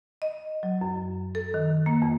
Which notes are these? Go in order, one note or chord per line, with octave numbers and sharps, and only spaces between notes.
D#5
F#3
F#2
A4
D#3
A#3
F2